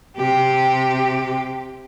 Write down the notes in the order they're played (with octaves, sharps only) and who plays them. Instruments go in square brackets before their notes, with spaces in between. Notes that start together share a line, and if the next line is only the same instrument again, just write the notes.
[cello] C3 G4